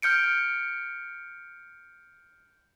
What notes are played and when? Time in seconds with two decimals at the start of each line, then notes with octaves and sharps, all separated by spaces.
0.02 F6 G6 C#7 D7